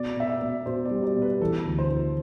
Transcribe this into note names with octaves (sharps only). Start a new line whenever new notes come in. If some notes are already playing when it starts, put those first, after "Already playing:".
Already playing: B2 D5
B2 E5
D5
B2
B2 C5
D5
G3
D5
B2
B4
E3 A4
D2
C5
E3